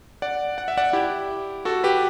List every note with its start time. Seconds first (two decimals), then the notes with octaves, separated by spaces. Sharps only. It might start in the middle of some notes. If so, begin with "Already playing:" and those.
0.22 D5 F#5
0.58 F#5
0.68 E5
0.77 D5 F#5
0.93 E4 G4
1.65 F#4 A4
1.84 G4 B4